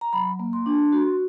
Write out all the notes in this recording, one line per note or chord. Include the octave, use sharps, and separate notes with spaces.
A#5
F#3 B5
A#3
C6
D4
F#4